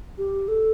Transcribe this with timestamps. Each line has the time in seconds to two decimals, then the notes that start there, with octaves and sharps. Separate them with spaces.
0.18 G4
0.48 A4